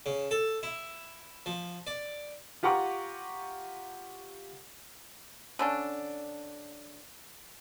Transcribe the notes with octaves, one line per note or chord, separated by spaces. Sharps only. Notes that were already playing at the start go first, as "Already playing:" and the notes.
C#3
A4
E4
F3
D5
F4 G4 F#5 A#5 C#6 D6
D3 C#4 D4